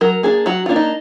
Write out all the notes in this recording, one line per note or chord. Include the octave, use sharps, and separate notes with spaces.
F#3 A#4
A#3 D4 G#4
F#3 F#4
A#3 D4 F4
D#4